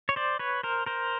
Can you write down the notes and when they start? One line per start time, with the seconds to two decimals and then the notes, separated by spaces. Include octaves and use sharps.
0.09 C#5
0.16 C5 D5
0.39 B4 C#5
0.63 A#4 C5
0.86 A#4 C5